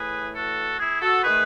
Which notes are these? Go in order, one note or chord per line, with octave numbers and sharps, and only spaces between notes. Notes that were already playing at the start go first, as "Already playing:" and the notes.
Already playing: A2 E3 A3 G#4 B4
F#4 A4
E4 G#4
F#4 A4
D#3 A3 G#4 B4